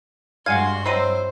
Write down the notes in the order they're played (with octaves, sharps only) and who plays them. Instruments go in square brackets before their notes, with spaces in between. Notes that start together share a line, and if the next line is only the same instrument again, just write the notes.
[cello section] G2 [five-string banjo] G#3 F5 [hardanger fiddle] F#4 C6 [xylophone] F#5 G#5 G#6
[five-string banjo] F#3 C4 E4 [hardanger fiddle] C5 [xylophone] D#5 C7 D#7